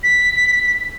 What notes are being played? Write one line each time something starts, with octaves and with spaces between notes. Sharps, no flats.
B6